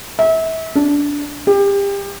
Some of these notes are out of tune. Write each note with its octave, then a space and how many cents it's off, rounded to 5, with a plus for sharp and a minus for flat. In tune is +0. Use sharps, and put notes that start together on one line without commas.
E5 -30
D4 -20
G4 +30